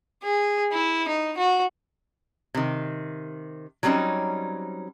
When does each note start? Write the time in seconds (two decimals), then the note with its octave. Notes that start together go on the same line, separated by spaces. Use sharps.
0.23 G#4
0.72 E4
1.07 D#4
1.37 F#4
2.55 C3 D#3
3.83 F#3 G3 C4 C#4 D#4